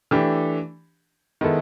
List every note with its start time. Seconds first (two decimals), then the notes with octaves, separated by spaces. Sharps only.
0.11 E3 A3 D4 G4
1.41 D#3 G#3 B3 E4 A4